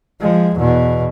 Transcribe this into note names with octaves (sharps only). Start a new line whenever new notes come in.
F3 G#3
E2 B2